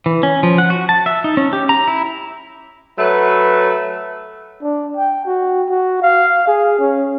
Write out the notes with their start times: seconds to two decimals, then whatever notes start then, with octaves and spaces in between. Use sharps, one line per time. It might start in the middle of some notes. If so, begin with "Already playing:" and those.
0.06 E3
0.23 C#4
0.43 F3
0.58 F#5
0.70 F#4
0.89 A5
1.06 E5
1.24 D#4
1.37 C#4
1.53 G4
1.69 A#5
1.88 E4
2.98 F#3 A3 B4
4.62 D4
4.97 G5
5.26 F#4
5.69 F#4
6.02 F5
6.47 G#4
6.79 C#4